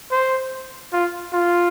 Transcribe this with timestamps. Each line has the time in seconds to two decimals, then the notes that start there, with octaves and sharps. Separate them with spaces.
0.12 C5
0.93 F4
1.33 F4